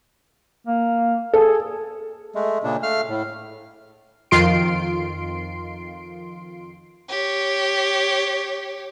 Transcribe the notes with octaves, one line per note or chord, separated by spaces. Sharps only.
A#3
G#4 A4
G#3 A3
A#2 C#3 D4
A3 F5 F6
A2
F2 D#3 F4 C6 C7 D7
G4 C#5